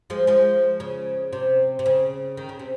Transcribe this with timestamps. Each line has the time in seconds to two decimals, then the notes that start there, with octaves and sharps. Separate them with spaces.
0.10 F3 G#3
0.27 F3 G#3
0.80 C#3
1.33 C3
1.79 C3
1.86 C#3
2.37 D#3
2.49 C#3
2.59 C3